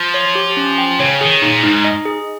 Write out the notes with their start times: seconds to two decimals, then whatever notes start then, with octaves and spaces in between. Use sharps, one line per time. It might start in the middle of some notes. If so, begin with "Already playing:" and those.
Already playing: F3
0.14 C#5
0.35 G4
0.57 C#4
0.78 G5
0.99 C#3 C#5
1.21 D#3 G#4
1.42 A#2 D#4
1.63 G#2 D#4
1.85 D#5
2.06 G#4